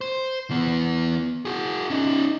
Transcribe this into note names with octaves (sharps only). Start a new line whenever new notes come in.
C5
E3 B3
F#4 G#4
C#4 D#4